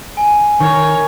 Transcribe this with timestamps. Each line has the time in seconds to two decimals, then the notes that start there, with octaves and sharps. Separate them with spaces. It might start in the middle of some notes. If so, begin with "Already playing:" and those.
0.17 G#5
0.60 D#3 A#4 C#5 C#6